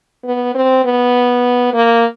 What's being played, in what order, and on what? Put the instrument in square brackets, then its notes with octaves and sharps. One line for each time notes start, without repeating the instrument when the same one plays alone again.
[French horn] B3
C4
B3
A#3